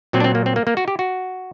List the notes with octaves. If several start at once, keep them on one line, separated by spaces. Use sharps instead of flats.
A#2 F#3 C4
D4
C4
A#3
C4
A#3
A#3
F#4
G4
F#4